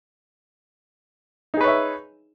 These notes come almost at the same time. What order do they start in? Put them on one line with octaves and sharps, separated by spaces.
D#4 G#4 B4 C#5 E5